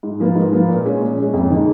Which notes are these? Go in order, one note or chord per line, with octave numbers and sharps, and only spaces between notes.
G#2
F3 A#3 F4 B4
G#2
F3 A#3 F4 B4
A#2
G#3 C#4
A#2
G#3 C#4
F2
D#3 G#3